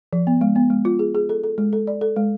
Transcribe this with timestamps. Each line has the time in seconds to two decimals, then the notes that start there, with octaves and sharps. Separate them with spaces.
0.13 F3
0.27 B3
0.41 G#3
0.56 B3
0.70 G#3
0.85 F4
0.99 G#4
1.15 G#4
1.29 A4
1.44 A4
1.58 G#3
1.73 A4
1.87 D5
2.01 A4
2.16 G#3